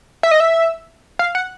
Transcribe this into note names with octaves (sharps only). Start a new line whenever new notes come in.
E5
D#5
E5
F5
F#5